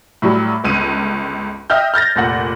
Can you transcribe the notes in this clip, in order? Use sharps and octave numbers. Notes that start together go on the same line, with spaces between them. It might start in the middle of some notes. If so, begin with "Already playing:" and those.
A2 F#3 G3
G1 C#2 D#7
D#5 E5 G5 F6 G6
F6 G6 A6 A#6
F1 A#2 F#5